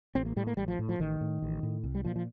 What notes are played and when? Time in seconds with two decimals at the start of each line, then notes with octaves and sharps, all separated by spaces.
0.15 A1 C4
0.26 A#3
0.36 A2 G3
0.47 A#3
0.57 A1 G3
0.68 F3
0.79 A2
0.89 F3
1.00 A1 D#3
1.21 A2
1.42 A1
1.63 A2
1.84 C2
1.95 G3
2.05 A#2 F3
2.16 F3